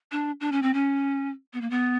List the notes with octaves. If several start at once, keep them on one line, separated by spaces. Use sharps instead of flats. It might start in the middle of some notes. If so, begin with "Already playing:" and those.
D4
D4
C#4
C4
C#4
B3
A#3
B3